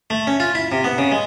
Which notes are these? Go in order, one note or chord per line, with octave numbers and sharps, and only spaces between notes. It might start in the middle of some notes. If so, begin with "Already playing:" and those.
A3
C#4
F4
E4
C3
B3
C#3
G#3